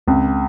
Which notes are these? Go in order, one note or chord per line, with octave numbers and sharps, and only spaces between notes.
C#2 C4